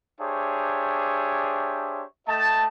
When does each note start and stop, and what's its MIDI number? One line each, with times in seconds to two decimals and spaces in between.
0.20 2.03 62
0.20 2.03 67
0.20 2.03 68
0.20 2.03 72
0.20 2.03 73
0.20 2.03 76
2.28 2.67 57
2.28 2.67 75
2.28 2.67 79
2.28 2.67 81